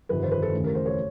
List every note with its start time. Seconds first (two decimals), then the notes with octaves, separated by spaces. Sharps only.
0.09 G1 F2 C3 D#3 B4
0.23 C5
0.31 B4
0.42 A4
0.54 F1 D#2 C#3 E3
0.64 A#4
0.75 C5
0.86 C#5